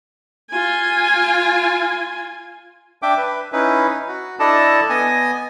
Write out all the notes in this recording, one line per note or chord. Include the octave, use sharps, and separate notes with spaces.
F4 G#5
D4 E5 G5 D6
B4
C#4 D#4 E4 B4
F#4
D4 E4 A4 D5 D#5 A5
B3 D#5 G#5